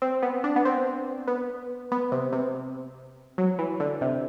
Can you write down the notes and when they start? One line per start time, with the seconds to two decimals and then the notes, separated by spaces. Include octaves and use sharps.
0.02 C4
0.23 B3
0.44 D4
0.56 B3
0.65 C4
1.28 B3
1.92 B3
2.12 C3
2.33 C3
3.38 F#3
3.59 E3
3.80 D3
4.01 C3